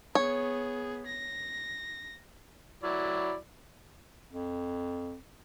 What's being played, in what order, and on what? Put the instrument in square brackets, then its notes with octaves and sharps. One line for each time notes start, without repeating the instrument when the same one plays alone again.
[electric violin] B3 G#4 [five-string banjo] C#5
[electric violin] A#6
[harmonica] F#3 E4 D5
[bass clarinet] F2